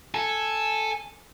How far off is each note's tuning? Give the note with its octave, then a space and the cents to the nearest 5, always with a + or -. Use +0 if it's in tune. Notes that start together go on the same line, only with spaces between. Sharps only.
A4 +0 G#5 +0